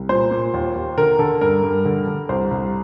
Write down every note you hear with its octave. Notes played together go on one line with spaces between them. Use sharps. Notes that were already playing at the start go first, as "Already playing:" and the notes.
Already playing: C2
A#2 C5
A#2
D#2
D#2
D3 A#4
D3 A4
G2 A#4
G2
D3
D3
C2 C5
C2